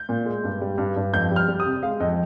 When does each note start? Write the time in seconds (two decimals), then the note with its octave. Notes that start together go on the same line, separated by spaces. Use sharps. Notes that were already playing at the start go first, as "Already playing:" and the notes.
Already playing: G6
0.09 A#2
0.26 G#3
0.44 G2
0.61 G3
0.78 G2
0.96 G2
1.13 F2 G6
1.31 G3
1.36 F6
1.48 G3
1.60 D#6
1.66 C3
1.83 G#3 F5
2.00 F2 D#5